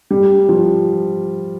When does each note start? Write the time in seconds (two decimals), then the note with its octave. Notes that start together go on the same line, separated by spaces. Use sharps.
0.11 G3
0.49 F3